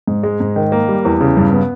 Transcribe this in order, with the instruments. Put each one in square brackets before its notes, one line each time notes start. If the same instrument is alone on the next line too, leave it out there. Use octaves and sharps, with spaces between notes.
[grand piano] G#2
G#3
G#2
D#3
A#3
G3
E2
C#3
G2
B3